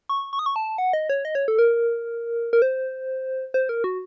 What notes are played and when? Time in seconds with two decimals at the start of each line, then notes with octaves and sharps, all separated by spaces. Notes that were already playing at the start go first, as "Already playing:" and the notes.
0.09 C#6
0.33 C#6
0.39 D#6
0.46 C#6
0.56 A5
0.78 F#5
0.93 D#5
1.10 C#5
1.25 D#5
1.35 C#5
1.48 A4
1.59 A#4
2.53 A#4
2.62 C5
3.54 C5
3.69 A#4
3.84 F#4